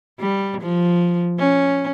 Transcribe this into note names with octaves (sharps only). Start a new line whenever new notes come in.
G3
F3
C#4